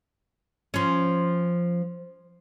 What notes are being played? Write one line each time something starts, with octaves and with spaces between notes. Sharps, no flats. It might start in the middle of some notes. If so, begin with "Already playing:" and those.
F3 C#4